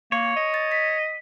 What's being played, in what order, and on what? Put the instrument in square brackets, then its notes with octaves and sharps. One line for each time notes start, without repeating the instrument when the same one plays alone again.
[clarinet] A#3 [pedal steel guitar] C#5
[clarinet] D#5
[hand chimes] A6
B6